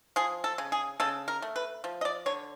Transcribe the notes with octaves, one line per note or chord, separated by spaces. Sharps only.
F3 G#4
A4
C#3
G#4
C#3 A4
A#4
A3
B4
F3
D#5
D5
D3 C#5